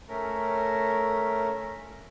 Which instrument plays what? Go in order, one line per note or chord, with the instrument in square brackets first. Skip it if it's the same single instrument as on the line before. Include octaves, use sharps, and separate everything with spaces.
[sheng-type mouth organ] A3 C#4 A#4